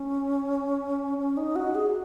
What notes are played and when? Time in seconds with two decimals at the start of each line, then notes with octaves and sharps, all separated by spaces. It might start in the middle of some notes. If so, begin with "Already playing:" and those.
Already playing: C#4
1.18 C#4
1.37 D#4
1.56 F#4
1.75 G#4